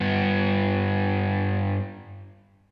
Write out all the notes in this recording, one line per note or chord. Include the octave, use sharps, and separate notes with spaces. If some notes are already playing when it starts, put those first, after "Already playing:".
G2 B3